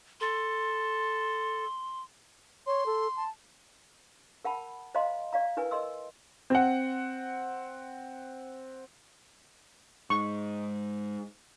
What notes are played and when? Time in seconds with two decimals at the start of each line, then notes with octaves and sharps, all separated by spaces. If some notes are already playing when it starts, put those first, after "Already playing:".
0.21 A4 C6
2.67 C#5 C6
2.86 A4
3.16 A5
4.45 A#4 F#5 A5 B5
4.95 C5 D#5 F5 A#5 C6
5.33 D5 F5 A#5
5.57 E4 A#4 B4 G#5
5.71 A#4 D#5 C6 E6
6.50 C4 F#5
10.10 G#2 C#6